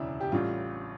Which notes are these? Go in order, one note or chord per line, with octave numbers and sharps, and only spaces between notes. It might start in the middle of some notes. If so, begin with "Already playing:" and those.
Already playing: E1 D2 C#3 D4 E4
G4
A1 A2 G3 F4